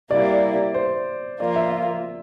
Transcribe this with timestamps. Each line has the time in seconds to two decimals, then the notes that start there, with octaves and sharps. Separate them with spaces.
0.10 C3 G3 A#3 E4 D5
0.74 C5
1.40 F3 A#3 F4 D5
1.56 E5
1.72 E5